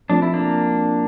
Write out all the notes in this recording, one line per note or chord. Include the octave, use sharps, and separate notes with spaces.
F3 A3 C4 D4 F4
E4
A#3 D4